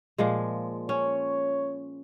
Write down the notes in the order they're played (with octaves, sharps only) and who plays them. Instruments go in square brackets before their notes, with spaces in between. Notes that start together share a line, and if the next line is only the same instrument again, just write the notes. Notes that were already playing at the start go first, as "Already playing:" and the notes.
[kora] A#2 F3 G#3
[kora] C#4 [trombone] C#5